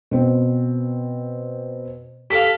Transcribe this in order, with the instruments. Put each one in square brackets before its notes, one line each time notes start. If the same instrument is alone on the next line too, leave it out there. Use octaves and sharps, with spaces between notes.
[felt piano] B2 C4
[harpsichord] G4 A4 F5 [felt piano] B6